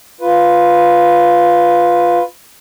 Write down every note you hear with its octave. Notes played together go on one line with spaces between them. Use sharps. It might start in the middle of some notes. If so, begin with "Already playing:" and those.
F4 B4